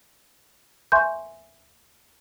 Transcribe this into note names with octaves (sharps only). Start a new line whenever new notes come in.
E5 G#5 C6 C#6 G6